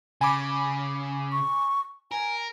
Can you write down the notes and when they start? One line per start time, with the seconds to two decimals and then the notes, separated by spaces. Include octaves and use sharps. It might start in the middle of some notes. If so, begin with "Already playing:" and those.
0.21 C#3 G#5 B5 D6
1.32 C#6
2.12 A#4 G#5